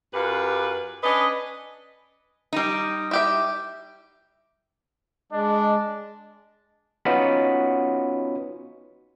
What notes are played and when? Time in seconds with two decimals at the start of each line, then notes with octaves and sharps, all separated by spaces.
0.14 F#2 F4 G4 B4
1.03 C#4 D4 B4 D#5
2.53 G3 D#4
3.11 E4 G4 E5
5.32 G#3 D4 D#5
7.05 B3 C#4 D#4 F4 F#4 B5